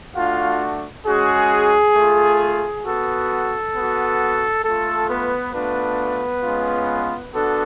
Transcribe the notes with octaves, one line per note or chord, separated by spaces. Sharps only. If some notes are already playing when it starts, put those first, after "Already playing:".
A3 D4 F4 F#4 F5
G#3 C#4 F#4 G#4
A3 F4
B3 F#4 A4
B3 F#4
A3 F4 A4
B3 B4
A3 B3 D4 F4 B4
G#3 C#4 F4
B3 D4 F#4 A4